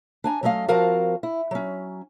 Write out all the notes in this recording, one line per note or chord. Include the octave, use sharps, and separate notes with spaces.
D4 G#5 A#5
F#3 A3 C#4 D#5 F5
F3 C4 F#4 A#4 F5 A5
E4
F#3 C#4